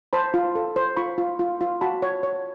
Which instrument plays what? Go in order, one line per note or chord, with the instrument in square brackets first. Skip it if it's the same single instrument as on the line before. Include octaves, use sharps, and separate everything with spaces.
[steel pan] C5 A5 B5
F4
A4
C5
F4 B5 C#6
F4
F4
F4
F#4 A5 B5
C#5
C#5